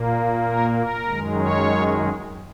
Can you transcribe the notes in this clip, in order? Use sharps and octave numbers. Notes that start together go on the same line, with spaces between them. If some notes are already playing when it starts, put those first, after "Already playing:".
Already playing: A#2 A#3
A#4
A#4
F#2 D#3 G#3
C#5